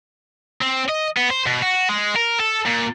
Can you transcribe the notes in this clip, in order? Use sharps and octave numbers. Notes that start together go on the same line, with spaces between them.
C4
D#5
B3
C5
B2
F#4
G#3
A#4
A4
A#2